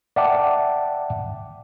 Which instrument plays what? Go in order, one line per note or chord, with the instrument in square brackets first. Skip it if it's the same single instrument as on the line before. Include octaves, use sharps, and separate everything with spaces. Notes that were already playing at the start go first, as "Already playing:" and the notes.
[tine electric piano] D5 E5 F#5 G5 A5 D6